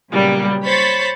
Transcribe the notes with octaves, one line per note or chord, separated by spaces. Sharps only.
A#2 C#3 F#3 G3 A#3 B3
C5 C#5 B5 C#6 A6 B6